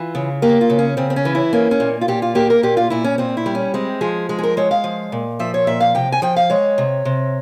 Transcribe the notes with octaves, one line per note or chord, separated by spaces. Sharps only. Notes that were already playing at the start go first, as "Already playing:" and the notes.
Already playing: E3 F4
C#3
A#3 G4
F4
C#3
C#4
C#3 C4
C4
C#4
E3
E4
A#3 C#4
C#4
A#2
F4
A#2 G4
F4
A#3 G4
A#4
A#2 G4
F4
A#2 E4
C#4
A#2 C4
E4
G3
C#4
G#3 C4
F3 G#4
G#3
G#4
A#4
G#3 C#5
F5
F3
A#2
F3 E5
C#5
A#2 E5
F5
C3 G5
G#5
F3 G5
F5
G#3 C#5
C3
C3